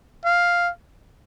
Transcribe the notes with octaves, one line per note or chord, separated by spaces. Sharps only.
F5